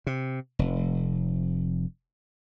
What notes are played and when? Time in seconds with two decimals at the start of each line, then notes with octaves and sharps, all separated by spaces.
0.07 C3
0.59 F1